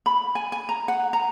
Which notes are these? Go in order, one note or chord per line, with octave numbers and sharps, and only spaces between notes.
B5
G#5
G#5
A#5
F#5
A#5